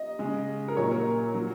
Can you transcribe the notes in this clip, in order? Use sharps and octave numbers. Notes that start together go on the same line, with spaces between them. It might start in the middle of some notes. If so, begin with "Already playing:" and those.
Already playing: D#5
C#3 G#3
A#4
A#2 F#3 C#5
A#4
F#3